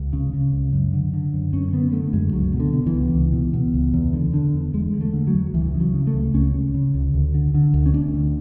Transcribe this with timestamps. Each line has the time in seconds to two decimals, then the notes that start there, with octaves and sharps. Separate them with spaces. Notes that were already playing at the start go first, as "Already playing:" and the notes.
Already playing: C#2
0.13 C#3
0.33 C#3
0.52 C#2
0.72 F#2
0.93 D3
1.13 D3
1.33 F#2
1.53 F#2 C#4
1.73 D3 B3
1.93 D3 A3
2.13 F#2 G#3
2.33 C#2 F#3
2.53 B2
2.60 D3
2.73 B2
2.86 E3
2.94 C#2
3.14 C#2
3.33 B2
3.53 B2
3.74 C#2
3.94 E2
4.13 D3
4.34 D3
4.54 E2
4.74 E2 G#3
4.94 D3
5.01 A3
5.13 D3
5.27 F#3
5.34 E2
5.54 C#2 E3
5.74 C#3
5.80 F#3
5.94 C#3
6.07 A3
6.14 C#2
6.34 C#2 C#4
6.54 C#3
6.74 C#3
6.94 C#2
7.14 D2
7.34 D3
7.54 D3
7.74 D2
7.86 C#4
7.94 D2 D4
8.15 D3